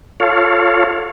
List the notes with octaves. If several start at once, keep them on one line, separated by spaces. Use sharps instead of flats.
F4 A4 C#5 F5